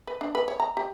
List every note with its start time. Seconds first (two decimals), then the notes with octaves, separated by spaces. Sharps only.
0.07 B4
0.21 D4
0.35 B4
0.48 C#5
0.60 A#5
0.77 G4